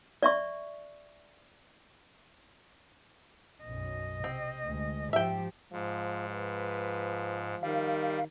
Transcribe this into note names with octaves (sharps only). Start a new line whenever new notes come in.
D5 E5 C#6
B1 F#2 D#5
C3 C4
D2 G#3
G#2 F3 G4 E5 G5
G#2 F3
F3 B4
D#3 G3 F5